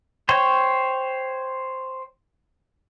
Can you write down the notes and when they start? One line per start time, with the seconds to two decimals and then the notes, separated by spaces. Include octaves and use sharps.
0.29 C5 C#5 G5